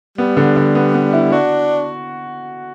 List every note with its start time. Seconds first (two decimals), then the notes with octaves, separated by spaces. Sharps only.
0.18 G3 B3
0.37 D3
0.56 D3
0.75 B3
0.94 B3
1.13 E4
1.32 D4 F#4